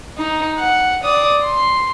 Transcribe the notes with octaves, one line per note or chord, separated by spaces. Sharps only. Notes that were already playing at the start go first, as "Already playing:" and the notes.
D#4
F#5
D5 D#6
C6